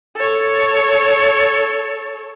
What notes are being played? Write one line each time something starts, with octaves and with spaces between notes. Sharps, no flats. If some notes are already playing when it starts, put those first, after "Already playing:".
A4 C#5